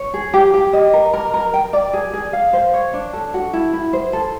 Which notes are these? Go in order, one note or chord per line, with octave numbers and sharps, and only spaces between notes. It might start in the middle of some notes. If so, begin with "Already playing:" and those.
Already playing: C#5
G#4
G4
G4
D#5
A#4
A#4
A#4
G5
D5
G#4
G#4
F5
C5
C#5
D4
A4
F#4
E4
E4
C5
A4